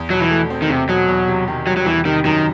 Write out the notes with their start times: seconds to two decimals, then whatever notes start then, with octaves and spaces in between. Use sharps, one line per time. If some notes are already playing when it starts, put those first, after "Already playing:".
Already playing: E2
0.10 B2 F#3
0.20 E3
0.31 A3
0.50 C4
0.62 D#3
0.69 E2 C3
0.89 B2 F#3
1.08 E2
1.28 C3
1.48 D#3
1.66 F#3 G3
1.77 F#3
1.86 E2 E3
2.05 C3 D#3
2.24 F#2 D#3